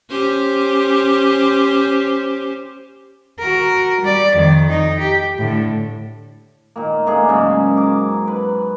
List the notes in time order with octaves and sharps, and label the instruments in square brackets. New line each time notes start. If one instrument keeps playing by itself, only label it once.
[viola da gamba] C#4 G4 C5
[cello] F#4 A#4
G3 D5
F2 D#3
D#4
G4
A2 D3
[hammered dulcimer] A#2 D#3 A#3
A3 A#3 D4 G#4
G#2 C#3 F#3 C#4
A#4 D6
B4